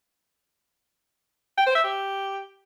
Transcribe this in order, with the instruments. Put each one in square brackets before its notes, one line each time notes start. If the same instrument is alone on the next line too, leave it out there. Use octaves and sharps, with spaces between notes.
[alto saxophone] G5
C5
E5
G4